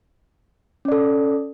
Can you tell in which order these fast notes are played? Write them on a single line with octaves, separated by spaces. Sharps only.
C#4 D5 A4